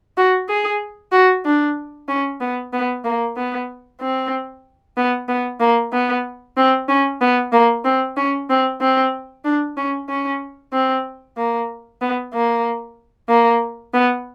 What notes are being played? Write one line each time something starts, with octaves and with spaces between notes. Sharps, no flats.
F#4
G#4
F#4
D4
C#4
B3
B3
A#3
B3
C4
B3
B3
A#3
B3
C4
C#4
B3
A#3
C4
C#4
C4
C4
D4
C#4
C#4
C4
A#3
B3
A#3
A#3
B3